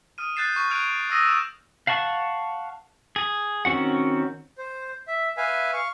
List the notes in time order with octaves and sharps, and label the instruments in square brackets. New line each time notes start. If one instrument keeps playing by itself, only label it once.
[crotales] D#6 F6 D#7
F#6 G6 A6 C7 E7
C#6
F6 F#6 G#6 D7 F7
D#6 E6 A#6 D#7
D#6 E7
[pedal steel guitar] F5 F#5 A5 C#6
G#4
D#3 C4 C#4 F#4 F#5
[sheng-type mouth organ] C5
E5
B4 E5 F5 G#5
F5 C#6